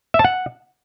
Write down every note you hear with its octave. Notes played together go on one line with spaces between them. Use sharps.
E5
A5
F#5